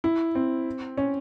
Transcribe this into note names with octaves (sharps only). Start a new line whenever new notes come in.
E4
C4
C#4